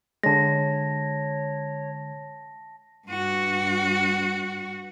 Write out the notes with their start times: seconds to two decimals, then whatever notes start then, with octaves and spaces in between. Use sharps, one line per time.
0.23 D3 G#3 C#5 A5 A#6
3.08 G2 F#4